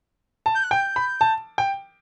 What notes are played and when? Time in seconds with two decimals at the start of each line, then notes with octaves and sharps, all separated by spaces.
0.46 A5
0.55 G6
0.64 F#6
0.71 G5 G6
0.96 B5
1.21 A5
1.58 G5